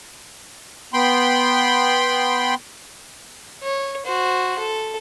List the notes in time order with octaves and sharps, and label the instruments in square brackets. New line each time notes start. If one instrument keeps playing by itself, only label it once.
[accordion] B3 G5 B5 C6
[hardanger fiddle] C#5
F#4 C5
A4